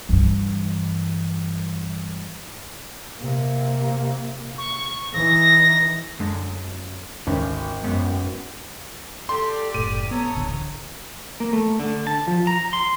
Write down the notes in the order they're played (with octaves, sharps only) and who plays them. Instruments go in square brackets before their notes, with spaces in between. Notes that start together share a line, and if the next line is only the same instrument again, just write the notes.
[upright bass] G2 E3
[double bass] C3 A#3
[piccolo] C#6
[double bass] E3 D#4 [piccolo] A#6
[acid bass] F#2 [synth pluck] D3 G#3 D4
[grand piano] G#1 [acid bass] D2 [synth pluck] C#4
[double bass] F#2 [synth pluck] G#3 C4 [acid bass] B3
[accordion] G4 D5 [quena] A4 [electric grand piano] C6
[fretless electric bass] F#1 A2 [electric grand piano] D#7
[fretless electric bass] B3 [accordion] A4 C#5 D#6 [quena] A#5
[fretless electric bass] D1 A1 D3
[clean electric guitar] A#3
A3
D3
A5
F3
A#5
C6